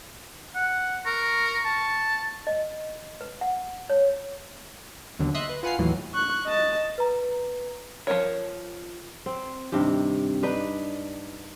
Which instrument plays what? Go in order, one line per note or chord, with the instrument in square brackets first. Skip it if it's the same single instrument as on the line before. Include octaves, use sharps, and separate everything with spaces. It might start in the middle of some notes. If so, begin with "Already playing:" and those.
[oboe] F#5
[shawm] A#4 [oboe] C#6
[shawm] A5
[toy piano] D#5
B4
F#5
C#5
[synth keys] D#2 B2 D3 F#3
D#5 E5 C6 D#6 F#6
B4
F4 B4 F#5 G#5 F6 C7
D#2 A2 E3 F#3
[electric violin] C#6 F#6
D#5 A5
[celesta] B4 A#5
[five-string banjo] F3 A3 A#4 C#5
[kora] C4
G2 C3 D#3 G4
D4 D#4 B4